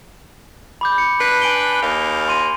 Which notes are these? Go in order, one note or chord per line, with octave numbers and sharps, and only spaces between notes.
B5 D6 G6
C#7
D4 B4 C7
G#5 D7 G7
D#2 D#3 F5
C6 D#7